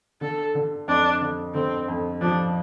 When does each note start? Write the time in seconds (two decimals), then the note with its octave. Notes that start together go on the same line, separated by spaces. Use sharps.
0.21 D3 A4
0.55 D3
0.87 F2 D4
1.21 D3
1.54 D3 C4
1.88 F2
2.21 F3 D4